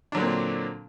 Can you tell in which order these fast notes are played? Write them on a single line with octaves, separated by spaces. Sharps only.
D4 F#3 D3 A#2 C4